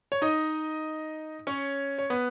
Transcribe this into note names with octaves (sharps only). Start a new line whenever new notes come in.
C#5
D#4 D#5
C#4 C#5
C#5
B3 B4